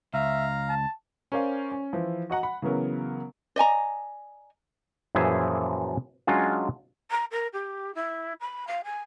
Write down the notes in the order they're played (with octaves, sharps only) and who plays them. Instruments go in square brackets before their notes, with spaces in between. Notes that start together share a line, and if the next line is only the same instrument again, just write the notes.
[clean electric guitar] C#2 [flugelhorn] E5 [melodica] F5 A#5
[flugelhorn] A5
[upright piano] C#4 A#4 C5 D5 F5 G#5
C#4
E3 F3 E4
F#4 D#5 F#5 A#5
F#5 B5
C#3 E3 F#3 B3 A#4
[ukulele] D5 D#5 G#5 A#5
[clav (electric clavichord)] F#2 A#2 E3 F3 G#4 E5
F#3 G#3 C#4 D4 F4
[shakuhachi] A#5
A#4
G4
E4
B5
F5
G#5